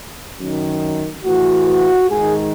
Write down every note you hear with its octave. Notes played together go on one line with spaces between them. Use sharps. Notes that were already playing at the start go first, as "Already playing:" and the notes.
F#2 D#3
A2 E3 F#4
G#2 D#3 G#4